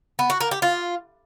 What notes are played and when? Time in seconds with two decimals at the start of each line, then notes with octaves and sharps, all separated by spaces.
0.19 B3
0.30 F#4
0.41 A#3
0.51 G4
0.62 F4